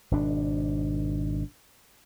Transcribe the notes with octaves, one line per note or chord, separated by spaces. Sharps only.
G#1 B2 D4